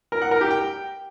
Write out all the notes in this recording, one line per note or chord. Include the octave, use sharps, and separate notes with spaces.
A#4
F#5
A#4
G4
G5